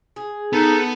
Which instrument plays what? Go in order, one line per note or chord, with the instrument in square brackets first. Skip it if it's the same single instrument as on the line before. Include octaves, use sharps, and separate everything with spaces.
[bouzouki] G#4
[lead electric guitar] B3 [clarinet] D#4 [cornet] A4